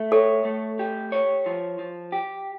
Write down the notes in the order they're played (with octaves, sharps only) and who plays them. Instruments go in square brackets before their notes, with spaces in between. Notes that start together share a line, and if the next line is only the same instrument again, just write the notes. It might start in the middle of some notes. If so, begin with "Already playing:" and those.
Already playing: [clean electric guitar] A3
[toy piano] A4 [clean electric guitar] C#5
[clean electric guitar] A3
G4
C#5
F3
F3
G4